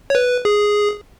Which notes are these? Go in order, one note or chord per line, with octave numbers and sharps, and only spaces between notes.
C#5
B4
G#4